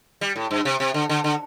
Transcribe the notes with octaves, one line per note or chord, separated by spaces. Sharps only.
G3
A2
G2
C3
C3
D3
D3
D3